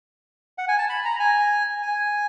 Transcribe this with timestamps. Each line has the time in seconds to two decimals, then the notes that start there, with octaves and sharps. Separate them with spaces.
0.58 F#5
0.68 G#5
0.78 A5
0.89 B5
1.05 A#5
1.20 G#5
1.82 G#5